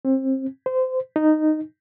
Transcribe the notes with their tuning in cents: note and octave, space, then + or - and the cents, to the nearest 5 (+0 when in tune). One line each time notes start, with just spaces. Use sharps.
C4 +25
C5 -25
D#4 -10